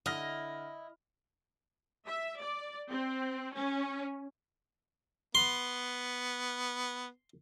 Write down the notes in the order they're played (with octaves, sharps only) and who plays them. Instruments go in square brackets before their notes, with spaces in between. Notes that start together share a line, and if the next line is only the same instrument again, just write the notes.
[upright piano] D3 F6 A#6 [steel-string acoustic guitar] E4 [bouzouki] D#5
[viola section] E5
D5
C4
C#4
[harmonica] B3 [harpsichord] C6